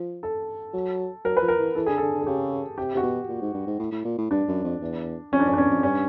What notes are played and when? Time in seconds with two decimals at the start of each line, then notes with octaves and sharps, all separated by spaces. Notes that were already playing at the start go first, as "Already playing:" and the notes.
Already playing: F3
0.23 A4
0.74 F#3
1.25 F#3 A#4
1.37 B4
1.42 F3
1.48 A#4
1.59 E3
1.75 E3 A4
1.86 D3 G#4
1.97 D3 A4
2.14 D3
2.22 G#4
2.26 C#3 G4
2.78 C3 G4
2.95 C3 F#4
3.02 B2 G4
3.29 A#2
3.42 G#2
3.54 G2
3.67 G#2
3.79 A2
3.92 A2
4.05 A#2
4.18 A2
4.30 G2 D4
4.48 F#2
4.64 F2
4.81 E2
5.32 F2 C#4
5.40 D4
5.45 F2 C#4
5.53 D4
5.57 E2 C#4
5.71 F2
5.83 G2 C#4